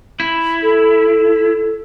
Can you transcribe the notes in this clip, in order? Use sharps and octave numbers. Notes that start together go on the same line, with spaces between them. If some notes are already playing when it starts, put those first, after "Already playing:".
E4
A4